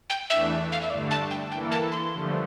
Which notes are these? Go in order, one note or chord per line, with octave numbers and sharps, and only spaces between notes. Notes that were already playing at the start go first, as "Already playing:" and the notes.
G5
E2 E3 A3 D4 E5
F5
E5
G2 D3 A3 D4 D5
A5
G5
E3 A#3 E4 A4 G5
A5
C6
G2 D3 F3 A3